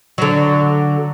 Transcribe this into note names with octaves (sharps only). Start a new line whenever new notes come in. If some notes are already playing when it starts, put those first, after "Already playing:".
D3 F#3